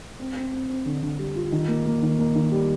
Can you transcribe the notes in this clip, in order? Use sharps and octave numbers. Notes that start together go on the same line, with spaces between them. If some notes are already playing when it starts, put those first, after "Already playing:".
C4
C4
C4
C4
D3
D3
G3
F4
D#3
A#3
A#3
D#3
A#3
D#3
G3